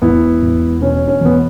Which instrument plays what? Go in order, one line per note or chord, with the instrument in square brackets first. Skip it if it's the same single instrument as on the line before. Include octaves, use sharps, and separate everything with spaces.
[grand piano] E1 B3 E4
E1
B2 C#4
C#4
E2 B3